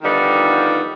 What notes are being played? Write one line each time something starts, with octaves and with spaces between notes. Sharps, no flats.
D3 D#3 F3 G3 B3 D#4